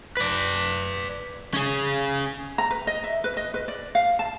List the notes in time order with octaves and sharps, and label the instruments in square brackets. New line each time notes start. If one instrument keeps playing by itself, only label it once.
[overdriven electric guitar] B4 D5
C#4 G#4
[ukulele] A#5
B4
D#5
E5
B4
D#5
B4
D5
F5
A5